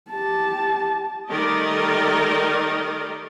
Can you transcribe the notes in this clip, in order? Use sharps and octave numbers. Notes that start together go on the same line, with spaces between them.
G4 A5
D#3 G3 A3 A#4 D5 D#5